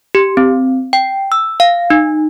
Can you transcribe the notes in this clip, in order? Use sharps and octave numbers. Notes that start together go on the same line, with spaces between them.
G4
C4
G5
E6
F5
D#4